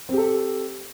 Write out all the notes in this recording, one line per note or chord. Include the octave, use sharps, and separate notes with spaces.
C4 G4 A4